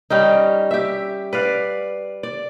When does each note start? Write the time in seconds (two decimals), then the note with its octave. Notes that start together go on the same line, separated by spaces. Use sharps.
0.10 G3 C#4 D#4
0.71 G4 E5
1.33 B4 D5 F5
2.23 D5